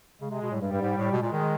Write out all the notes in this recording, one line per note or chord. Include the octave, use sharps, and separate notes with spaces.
C#3 G#3
C3
B2
A2 G3
G2
G2
G#2
A2
B2 G#3
A#2
D#3